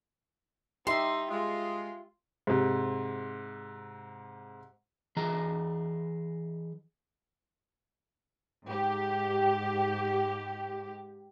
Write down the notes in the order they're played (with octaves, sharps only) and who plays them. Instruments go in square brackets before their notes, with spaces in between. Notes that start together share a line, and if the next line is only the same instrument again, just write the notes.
[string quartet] D#4 [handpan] G4 E5 [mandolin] C6
[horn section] G#3 [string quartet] F4
[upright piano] G#2 C3
[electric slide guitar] E3 G#4 D#5 A#5
[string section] G#2 G4